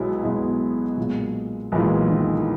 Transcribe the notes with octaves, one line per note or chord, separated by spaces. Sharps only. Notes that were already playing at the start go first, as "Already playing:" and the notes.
Already playing: B1 B2 F#3 G#3 B3 E4
B1 B2 G#3 B3 E4
B1 A#2 G#3
B1 A#2 E3 G#3
D#3